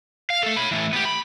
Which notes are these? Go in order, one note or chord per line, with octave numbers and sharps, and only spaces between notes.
F5
A3 A4
C#5 B5
E3 A3
B3 G4
B5